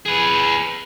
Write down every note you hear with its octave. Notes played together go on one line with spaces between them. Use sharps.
G#4 B4